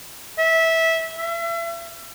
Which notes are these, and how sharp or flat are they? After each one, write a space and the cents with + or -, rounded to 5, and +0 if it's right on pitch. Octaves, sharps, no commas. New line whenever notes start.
E5 -15
E5 +35